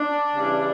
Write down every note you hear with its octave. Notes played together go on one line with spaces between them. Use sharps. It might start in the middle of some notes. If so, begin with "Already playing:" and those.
Already playing: D4
E2 C#3 E3 G3